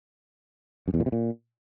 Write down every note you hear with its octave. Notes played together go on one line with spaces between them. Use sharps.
F#2
E2
A#2
C3
A#2